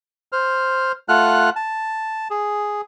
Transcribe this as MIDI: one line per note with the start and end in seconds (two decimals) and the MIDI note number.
0.32 0.92 72
0.32 0.92 89
1.09 1.50 57
1.09 1.50 65
1.09 1.50 78
1.09 1.50 89
1.09 1.50 90
1.56 2.28 81
2.31 2.81 68